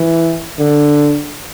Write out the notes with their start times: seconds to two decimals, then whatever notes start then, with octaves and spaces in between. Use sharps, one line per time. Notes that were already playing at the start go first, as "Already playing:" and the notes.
Already playing: E3
0.59 D3